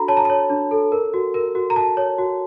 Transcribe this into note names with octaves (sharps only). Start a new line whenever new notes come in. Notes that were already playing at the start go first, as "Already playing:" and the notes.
Already playing: D4 F#4 A4 A#5 B5
C#5 A5
A#5
C#5 A5
D4
A4
A#4
F#4
A#4
F#4
A#5
F#4 A5
C#5
F#4